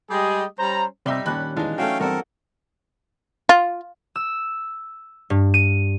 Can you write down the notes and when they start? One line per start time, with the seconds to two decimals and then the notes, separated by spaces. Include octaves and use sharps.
0.11 G3 G#3 G4 G#4 D#5
0.59 G3 C#4 C5 A#5
1.06 C3 G3 D#4 D5 E5 C6
1.26 D#2 A#2 C#4 D4 B5 F#6
1.56 E3 G#3 D4 D#4 F5
1.78 F#3 A3 C#4 F5 G5
2.00 E2 G2 A#3 C4 A4 A#4 F#5
3.49 F4
4.16 E6
5.30 G2
5.54 D#7